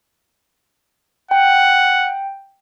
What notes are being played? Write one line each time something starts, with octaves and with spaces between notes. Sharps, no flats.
F#5 G5